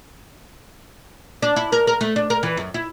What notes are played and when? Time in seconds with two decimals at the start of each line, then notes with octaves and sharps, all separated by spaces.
1.42 D4
1.56 E4
1.72 A#4
1.87 A#4
2.01 A3
2.16 D4
2.30 A#4
2.43 E3
2.57 F#2
2.74 E4